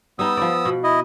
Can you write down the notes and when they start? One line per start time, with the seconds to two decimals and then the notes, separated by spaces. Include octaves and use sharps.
0.19 G3 B3 D#4 D#6 E6
0.37 F3 D5
0.65 B2
0.84 E4 D#5